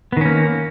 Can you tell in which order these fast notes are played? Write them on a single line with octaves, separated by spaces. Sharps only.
B3 D#3 C#4 A#3